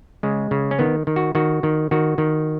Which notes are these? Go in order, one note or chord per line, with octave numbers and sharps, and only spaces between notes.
C#3 G#3
C#3
C#4
D#3 B3
D#3
F#4
D#3 F#4
D#3
D#3 F#4
D#3